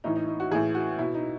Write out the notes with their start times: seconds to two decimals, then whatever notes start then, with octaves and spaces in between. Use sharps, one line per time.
0.04 A2 E3 D#4
0.16 D#4
0.28 D#4
0.40 F#4
0.51 A2 E3 G#4
0.75 F#4
0.99 B2 E4
1.14 D#4